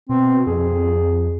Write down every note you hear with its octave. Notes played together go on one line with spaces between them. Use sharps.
B2 C4
F2 G#4